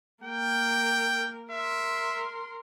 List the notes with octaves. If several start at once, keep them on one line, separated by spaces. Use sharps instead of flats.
A#3 A#4 G5
A#4 E5 C6